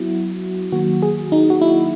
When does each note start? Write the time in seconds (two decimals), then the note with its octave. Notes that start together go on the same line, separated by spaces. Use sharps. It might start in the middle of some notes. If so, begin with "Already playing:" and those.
Already playing: F#3 B3 E4 F#4
0.72 D#3 F#3 A#3 F#4
1.02 G#4
1.32 D#4
1.50 F#4
1.62 E4